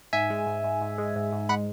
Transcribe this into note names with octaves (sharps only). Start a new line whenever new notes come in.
G#2 E5 G#5
G#3
G#2
G#2
G#2
G#3
G#2
G#2
G#3 F#5 B5